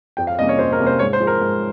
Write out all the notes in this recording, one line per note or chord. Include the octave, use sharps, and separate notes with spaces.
F2 G5
F5
C3 G3 A#3 C#4 D#5
C#5
F2 C5
A#4
C3 G3 A#3 C#4
C5
G#2 C#5
C5
F3 G#3
A#4
G#2